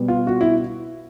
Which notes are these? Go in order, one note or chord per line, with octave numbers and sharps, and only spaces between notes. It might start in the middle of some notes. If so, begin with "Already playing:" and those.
Already playing: B2 G3 B3
F4
F#4
E4